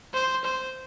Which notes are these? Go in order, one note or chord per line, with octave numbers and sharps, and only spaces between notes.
C5
C5